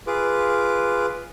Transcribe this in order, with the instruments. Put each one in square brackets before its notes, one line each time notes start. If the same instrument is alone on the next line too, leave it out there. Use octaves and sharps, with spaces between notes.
[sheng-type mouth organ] F4 G#4 B4 D6